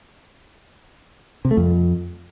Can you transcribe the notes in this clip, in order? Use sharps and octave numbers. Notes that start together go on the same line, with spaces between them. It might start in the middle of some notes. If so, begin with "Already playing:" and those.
C3
A3
F2